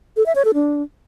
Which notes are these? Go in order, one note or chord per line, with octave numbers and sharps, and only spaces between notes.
A4
E5
C#5
A4
D4